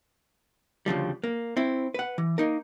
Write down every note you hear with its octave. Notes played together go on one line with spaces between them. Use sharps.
D2 C#3 F3 G3
A#3
C4 E4
B4 F#5
E3
A#3 D#4 A#4